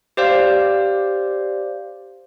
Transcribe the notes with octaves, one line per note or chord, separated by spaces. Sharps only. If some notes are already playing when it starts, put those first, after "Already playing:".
G4 C5 D5 F5